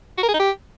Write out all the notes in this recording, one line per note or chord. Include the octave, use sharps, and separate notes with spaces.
F#4
A#4
G#4
D#4
G4